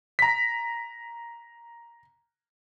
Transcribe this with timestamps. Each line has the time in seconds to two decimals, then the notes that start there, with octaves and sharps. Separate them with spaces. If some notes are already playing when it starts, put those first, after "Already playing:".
0.19 A#5 B6